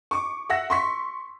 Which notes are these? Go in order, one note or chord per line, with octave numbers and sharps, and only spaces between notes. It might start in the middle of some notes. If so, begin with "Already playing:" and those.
C#6 D6
E5 F#5 E6 A#6
C6 C#6 B6